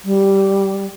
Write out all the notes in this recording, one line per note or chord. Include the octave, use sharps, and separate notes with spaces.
G3